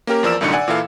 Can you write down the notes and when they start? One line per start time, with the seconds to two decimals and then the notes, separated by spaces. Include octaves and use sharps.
0.07 A#3 C#4 G4 A#4
0.23 E2 F3 A#4 D5 E6 E7
0.41 C2 F#2 A2 D3 D#4 C#7
0.53 D5 F#5 G#5
0.68 A#2 E3 E4 A4 F5